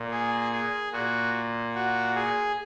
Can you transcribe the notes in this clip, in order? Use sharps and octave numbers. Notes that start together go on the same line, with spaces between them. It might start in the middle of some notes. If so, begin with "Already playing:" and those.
Already playing: A#2
G#4
G#4
A#2 F#4
F#4
G#4